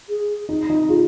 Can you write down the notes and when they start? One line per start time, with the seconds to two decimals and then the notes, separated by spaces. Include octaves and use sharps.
0.09 G#4
0.49 D#4
0.70 D#4
0.89 F4 G#4